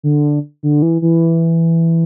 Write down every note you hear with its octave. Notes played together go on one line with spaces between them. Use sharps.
D3
D3
E3
E3